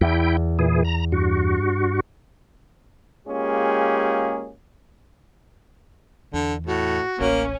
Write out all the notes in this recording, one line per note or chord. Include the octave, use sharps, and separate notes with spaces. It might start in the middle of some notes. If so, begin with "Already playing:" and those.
E2 E4 G5
A#2 E3 G#4
A#5
G2 F#4
G#3 A#3 C#4 F4 G4 G#4
E2 D3
A2 F#4
D1 A1 A#3 C#4